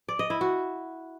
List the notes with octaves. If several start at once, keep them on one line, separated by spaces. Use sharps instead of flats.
D5
D#5
E4
F#4